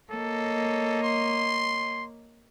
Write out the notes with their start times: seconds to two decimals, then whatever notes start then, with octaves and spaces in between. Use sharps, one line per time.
0.11 A#3 A4 C#5 D#5
1.04 C6